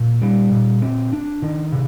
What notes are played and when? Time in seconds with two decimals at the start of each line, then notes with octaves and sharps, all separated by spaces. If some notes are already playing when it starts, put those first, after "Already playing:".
Already playing: A#2
0.22 G3
0.52 A#2
0.82 C4
1.13 D4
1.42 D#3
1.72 C3